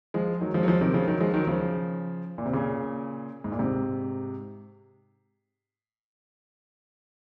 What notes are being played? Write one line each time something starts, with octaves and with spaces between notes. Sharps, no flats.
F3 G#3
D#3 F#3
F3 G#3
F#3
F3 G#3
C3 D#3
C#3 F3
D#3 F#3
F3 G#3
D#3 F#3
C#3 F3
A#2
C3
A#2 C#3
G#2
A#2
G#2 C3